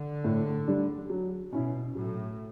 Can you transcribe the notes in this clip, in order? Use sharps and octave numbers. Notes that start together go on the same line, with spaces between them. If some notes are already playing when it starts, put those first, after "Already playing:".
Already playing: D3
A2
G3 D4
F#3
B2 C#4 E4
A2 F#3